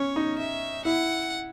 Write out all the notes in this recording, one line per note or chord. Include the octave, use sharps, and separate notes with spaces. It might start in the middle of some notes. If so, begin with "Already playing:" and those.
Already playing: C#4 C#5
D#4
E5
E4 F#5